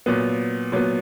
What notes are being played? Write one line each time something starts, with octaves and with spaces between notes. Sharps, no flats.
A#2 F#3 B3
A#2 F#3 B3